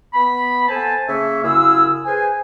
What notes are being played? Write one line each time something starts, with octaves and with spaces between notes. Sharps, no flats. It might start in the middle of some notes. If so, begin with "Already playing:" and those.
B3 B5
A4 C5 G#5 A5
C#3 A#3 C#5 E5
F#2 C#3 E4 G#4 F5 E6
G#4 B4 C5 G#5